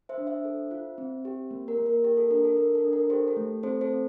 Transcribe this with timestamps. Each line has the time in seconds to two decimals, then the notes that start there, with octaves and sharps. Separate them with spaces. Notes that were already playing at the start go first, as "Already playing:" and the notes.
0.09 C5 E5
0.18 D4
0.27 C5 E5
0.45 A4
0.71 F4
0.98 C4
1.25 G4
1.51 A#3
1.68 A#4
1.77 A#3
1.86 A#4
2.04 G4 A#4
2.17 A4
2.31 D4 A#4
2.44 A4
2.57 D4 A#4
2.75 A4
2.84 D4
2.93 A#4
3.10 G4 A4 C5
3.28 A4
3.37 A3
3.63 C4 A4 C5
3.81 A4 C5
3.90 C4